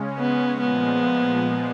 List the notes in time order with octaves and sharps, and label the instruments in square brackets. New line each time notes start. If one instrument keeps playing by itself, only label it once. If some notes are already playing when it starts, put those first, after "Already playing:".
Already playing: [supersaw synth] C#3 G#3 C#4
[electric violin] B3
[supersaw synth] A#2 F3 G#3 [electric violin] B3